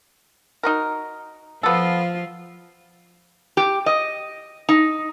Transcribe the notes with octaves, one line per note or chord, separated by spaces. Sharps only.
D#4 F#4 A#4
F3 B3 F4 A4
G4
D#5
D#4